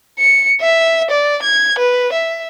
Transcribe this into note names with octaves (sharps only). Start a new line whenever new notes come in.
C#7
E5
D5
G#6
B4
E5